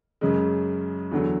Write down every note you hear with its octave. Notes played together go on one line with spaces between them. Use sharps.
F#2 C#3 G#3
E2 D3 F#3